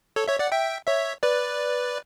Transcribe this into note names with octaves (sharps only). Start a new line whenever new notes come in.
A4 C#5
C#5 E5
D5 F#5
E5 G5
C#5 E5
B4 D5